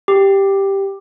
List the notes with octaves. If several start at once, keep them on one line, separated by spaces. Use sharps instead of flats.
G4